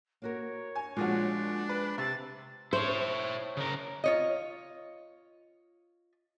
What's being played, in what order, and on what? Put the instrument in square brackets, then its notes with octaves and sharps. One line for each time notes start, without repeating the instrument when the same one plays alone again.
[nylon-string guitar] A#3 F#4 A#4 [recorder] C#5
[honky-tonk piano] G#5
[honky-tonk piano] A#2 F3 F#4 [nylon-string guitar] G#3 G#4 F5 [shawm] D4
[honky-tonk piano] B4 [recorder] B5
[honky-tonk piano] C3 [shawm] A5 [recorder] A6
[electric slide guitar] E4 C#5 [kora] C5
[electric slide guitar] C#3 A#4
[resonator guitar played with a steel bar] F4 C#5 D#5